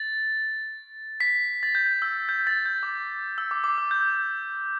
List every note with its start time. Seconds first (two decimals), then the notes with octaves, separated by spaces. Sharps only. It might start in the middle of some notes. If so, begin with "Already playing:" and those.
Already playing: A6
1.20 B6
1.63 A6
1.75 G6
2.02 E6
2.29 G6
2.47 A6
2.66 G6
2.83 D6
3.38 E6
3.51 D6
3.64 D6
3.78 E6
3.91 G6